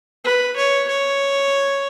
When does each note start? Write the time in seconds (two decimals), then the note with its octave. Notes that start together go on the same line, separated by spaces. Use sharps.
0.25 B4
0.56 C#5
0.88 C#5